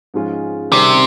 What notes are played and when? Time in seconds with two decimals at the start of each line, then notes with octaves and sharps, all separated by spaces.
0.14 G#2 F3 G#3 C#4 F4
0.72 C3 D#3 G3 C#4 G#4 C5